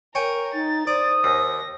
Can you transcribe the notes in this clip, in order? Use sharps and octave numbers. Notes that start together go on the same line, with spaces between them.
A#4 C#5 G5 G#5
D#4 A6
C5 D5 D#6
D#2 A#6